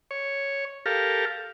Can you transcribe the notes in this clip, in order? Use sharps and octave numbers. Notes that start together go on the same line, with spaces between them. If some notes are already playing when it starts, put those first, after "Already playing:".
C#5
G4 A4 A#4 F5